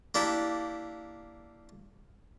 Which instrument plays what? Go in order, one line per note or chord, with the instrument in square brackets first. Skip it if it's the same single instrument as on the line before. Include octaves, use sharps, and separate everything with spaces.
[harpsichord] A#3 D4 E4 G4